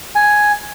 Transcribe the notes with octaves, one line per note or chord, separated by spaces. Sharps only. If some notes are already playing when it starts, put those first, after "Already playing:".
G#5